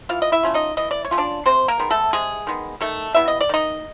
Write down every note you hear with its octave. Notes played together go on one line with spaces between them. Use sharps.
E3 F4 F5
D#5
E4 E5
A3 C#4 F4
D#4 D#5
E3 D#5
D5
C#5
A3 C#4 F4
D4 D5
C3 C4 C5
A#3 A#4
D#3 G#3 B3
A3 A4
C3 G#3 G#4
D#3 G#3 B3
D#3 A3 A4
G3 B3 E4 E5
D#5
D5
D#3 D#4 D#5